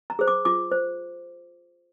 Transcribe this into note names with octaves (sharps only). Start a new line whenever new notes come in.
A#5
G#4 C5
D6
F4 D6
C5